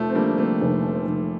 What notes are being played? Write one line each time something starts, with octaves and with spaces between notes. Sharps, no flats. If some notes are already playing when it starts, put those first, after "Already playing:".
Already playing: F1 F3 A3
C4
D3 G3 A#3
A3 C4
F1
F1